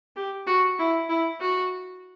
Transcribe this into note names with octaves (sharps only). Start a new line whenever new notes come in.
G4
F#4
E4
E4
F#4